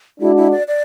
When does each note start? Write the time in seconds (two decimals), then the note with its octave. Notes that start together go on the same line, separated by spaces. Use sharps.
0.20 G#3 D4 E4 F#4
0.37 E4
0.52 D5
0.68 D5